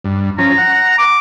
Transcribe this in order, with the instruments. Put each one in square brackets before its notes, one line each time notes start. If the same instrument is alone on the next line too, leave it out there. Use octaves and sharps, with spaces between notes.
[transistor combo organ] G2
[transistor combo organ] F3 C#4 [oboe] A#5
[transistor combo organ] F#5
[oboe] D6